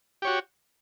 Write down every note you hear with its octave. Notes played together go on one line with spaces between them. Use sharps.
F#4 G4 C#5